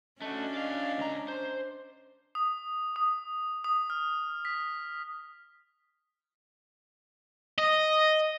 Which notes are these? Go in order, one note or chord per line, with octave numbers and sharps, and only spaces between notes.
A3 C#4 D4 F#4 D#5
D5 F5
C#2 A#5
C5
D#6
D#6
D#6
F6
B6
D#5